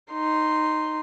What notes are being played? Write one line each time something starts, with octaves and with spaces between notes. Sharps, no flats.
D#4 C6